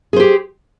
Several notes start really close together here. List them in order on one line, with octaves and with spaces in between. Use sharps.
G#4 C5 G4